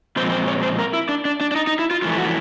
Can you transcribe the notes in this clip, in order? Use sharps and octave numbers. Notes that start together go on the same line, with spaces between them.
A#2 F3 G#3 C4 C5
C5
C#5
C5
A#4
E4
D4
D4
D4
D4
D#4
D#4
E4
F4
F2 C#3 E3 A3 F4
F#4